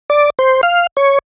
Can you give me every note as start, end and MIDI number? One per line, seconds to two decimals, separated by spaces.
0.10 0.30 74
0.39 0.61 72
0.63 0.87 77
0.97 1.19 73